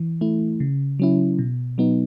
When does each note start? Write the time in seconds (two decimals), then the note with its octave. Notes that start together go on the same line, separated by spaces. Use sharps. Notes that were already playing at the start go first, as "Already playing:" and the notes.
Already playing: E3
0.21 A3 E4
0.60 C#3
0.99 F#3 C#4 E4
1.39 B2
1.78 F#3 B3 D#4